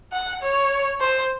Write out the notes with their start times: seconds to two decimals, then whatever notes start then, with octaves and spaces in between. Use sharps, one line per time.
0.12 F#5
0.42 C#5
1.00 C5